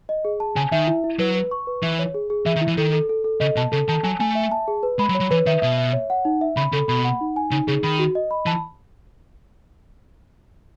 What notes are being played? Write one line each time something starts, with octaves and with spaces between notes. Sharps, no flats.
D#5
G#4
A5
C#3 G#5
D#3 E5
E4
E4
F#3 B4
B4
C#6
B4
E3 E5
C#5
G#4
G#4
E3 E5
D#3
E4
E3
D#3 A4
A4
A4
A4
C#3 D#5
B2 A5
C#3 A4
D#3 A5
F#3 G#5
A3 G#5
E5
A5
G#4
B4
G#3 B5
F#3
C#5
F#3
E3 B4
D#3 E5
B2 E5
E5
C#5
F#5
D#4
E5
C#3 B5
C#3 A4
B2 B5
F#5
D#4
G#5
C#3 D#4
C#3 G#4
D#3 B5
F#4
D#5
B5
E3 A5